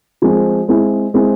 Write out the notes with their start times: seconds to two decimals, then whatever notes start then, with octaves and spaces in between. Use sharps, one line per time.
0.22 F3 G#3 C4 G#4
0.68 G#3 C4 E4
1.14 G#3 C4 E4